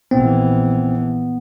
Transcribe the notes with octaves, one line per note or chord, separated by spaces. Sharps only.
A#1 E3 B3 C4